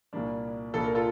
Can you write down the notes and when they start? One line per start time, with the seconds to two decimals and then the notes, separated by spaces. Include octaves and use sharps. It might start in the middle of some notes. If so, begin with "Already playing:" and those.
0.13 C2 A#2 G3 A#3 D4
0.74 C2 A#2 G3 A#3 D4 A4
0.84 A#4
0.95 F4 A4